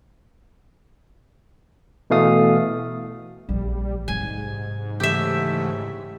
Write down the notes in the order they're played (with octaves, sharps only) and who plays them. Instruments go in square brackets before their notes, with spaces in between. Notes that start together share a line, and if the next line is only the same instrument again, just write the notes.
[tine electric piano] B2 E3 A3 F5 D#6
[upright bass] A#1 F3 [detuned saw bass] G3
[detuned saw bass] G#2 [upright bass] C3 F#3 [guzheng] G#5
[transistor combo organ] C#3 E3 A3 [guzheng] G4 E5